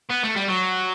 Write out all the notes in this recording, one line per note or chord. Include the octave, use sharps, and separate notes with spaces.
B3
A3
G3
F#3